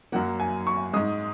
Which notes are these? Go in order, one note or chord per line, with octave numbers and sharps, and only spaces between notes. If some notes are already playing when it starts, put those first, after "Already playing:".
F#2 F#3 A#3 F#5
G#5
C#6
G#2 G#3 D#6